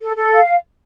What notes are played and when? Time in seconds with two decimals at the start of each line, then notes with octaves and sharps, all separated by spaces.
0.01 A4
0.16 A4
0.32 F5